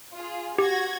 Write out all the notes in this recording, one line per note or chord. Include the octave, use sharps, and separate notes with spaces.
F4 G#4
F#4 G4 G#6 A#6